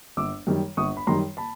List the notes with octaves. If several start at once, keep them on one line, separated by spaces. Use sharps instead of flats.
G1 D6 E6
F#2 D#3 G3
G1 C#6 D#6
B5
F#2 D#3 G3 A#5 C6
A5 B5